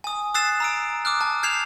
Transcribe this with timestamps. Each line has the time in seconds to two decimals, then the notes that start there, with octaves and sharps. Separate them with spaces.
0.04 G#5 D#6
0.34 D#6 E6 F#6 A6 C7 E7
0.60 A#5 E6 D7
1.05 D6 D#6 F6 F#6
1.21 A5
1.43 F6 G6 G#6 C7 E7 F7